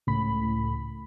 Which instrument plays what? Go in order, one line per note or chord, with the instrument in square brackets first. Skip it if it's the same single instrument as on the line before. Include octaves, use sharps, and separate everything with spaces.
[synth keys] C#2 A2 B5